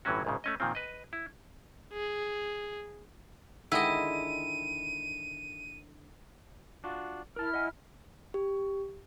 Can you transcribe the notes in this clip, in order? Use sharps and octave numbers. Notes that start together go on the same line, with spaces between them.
G1 A2 E3 F#3 C#4 F#4
A#1 G#2 C#3
A3 C#4 D#5
A#2 D#3 F3 C4
B4 D#5
E4
G#4
D3 D#3 G#3 E4 D#5 D#7
D4 F4 F#4
E4 A#4 A5 F6
D#5 F#5 G#5
G4